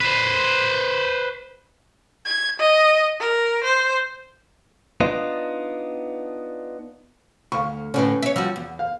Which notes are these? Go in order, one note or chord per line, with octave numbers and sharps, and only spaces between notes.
B4 C5
G#6
D#5
A#4
C5
B3 D4 D#4 F4
D2 F5 C#6
A2 D3 C#4 B4
C#5 E5
F3 G3 F#4 E6
E2
F5